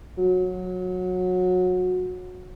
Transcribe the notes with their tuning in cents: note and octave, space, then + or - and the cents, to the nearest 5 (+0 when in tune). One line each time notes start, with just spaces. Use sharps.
F#3 -20